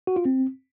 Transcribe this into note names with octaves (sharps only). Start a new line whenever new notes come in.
F#4
F4
C4